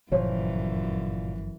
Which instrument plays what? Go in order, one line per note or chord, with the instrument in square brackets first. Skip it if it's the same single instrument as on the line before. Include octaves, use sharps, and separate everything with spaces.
[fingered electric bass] G1 F3 [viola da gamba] F#2 E3 [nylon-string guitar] A#2 [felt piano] C5 C#5